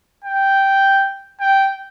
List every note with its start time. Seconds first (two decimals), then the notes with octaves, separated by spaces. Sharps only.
0.24 G5
1.40 G5